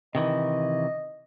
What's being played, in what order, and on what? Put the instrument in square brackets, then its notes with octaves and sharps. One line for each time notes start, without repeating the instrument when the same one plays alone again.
[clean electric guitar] C3 D#3 E3 [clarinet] D#5